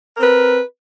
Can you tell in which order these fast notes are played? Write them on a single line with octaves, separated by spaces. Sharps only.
A#4 C4 B4